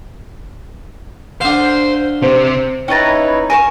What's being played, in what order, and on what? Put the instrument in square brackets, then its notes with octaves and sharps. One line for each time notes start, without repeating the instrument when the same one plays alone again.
[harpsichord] D3 F5 [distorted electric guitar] C5
[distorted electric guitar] C3 C4 [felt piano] C5
[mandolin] C#4 B4 A#5 [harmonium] D#4 E4 C#5 [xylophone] G5 A6
[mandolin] A#4 B4 C#5 [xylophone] G#5 E7